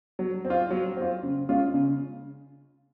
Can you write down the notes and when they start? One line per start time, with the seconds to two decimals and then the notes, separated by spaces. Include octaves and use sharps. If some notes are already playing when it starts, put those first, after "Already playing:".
0.19 F#3
0.45 C4
0.50 F4
0.70 F#3
0.97 C4 F4
1.23 C#3
1.49 G#3 C#4 F4
1.74 C#3